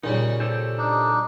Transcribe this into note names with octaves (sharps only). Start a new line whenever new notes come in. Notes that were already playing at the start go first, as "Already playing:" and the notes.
A#2 C#3 G3 D#4
G4 A4 C5
D4 D#4